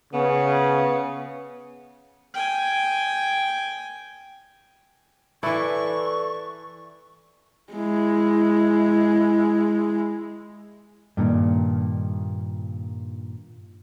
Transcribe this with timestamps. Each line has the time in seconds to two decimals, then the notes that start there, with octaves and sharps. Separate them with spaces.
0.13 C#3 B3
2.34 G5 G#5
5.43 E3 E4 A4 B4 D5 C#6
7.73 G#3 E4
11.17 G2 A#2 D3 D#3